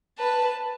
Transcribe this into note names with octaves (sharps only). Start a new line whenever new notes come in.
B4 A5